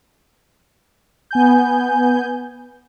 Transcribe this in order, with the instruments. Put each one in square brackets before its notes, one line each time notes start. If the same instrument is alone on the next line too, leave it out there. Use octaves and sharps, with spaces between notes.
[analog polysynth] B3 G#5 G6